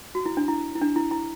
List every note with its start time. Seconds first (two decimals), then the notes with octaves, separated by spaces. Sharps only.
0.15 F#4
0.26 E4
0.37 D4
0.48 E4
0.75 E4
0.81 D4
0.96 E4
1.11 E4